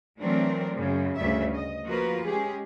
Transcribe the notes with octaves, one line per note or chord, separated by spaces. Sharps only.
E3 F#3 A3 C4 D4 A#4
F#2 C#3
D2 G2 C#3 E5
D#5
F3 A#3 F4 F#4 A#4 B4
G#3 C#4 G4 G#4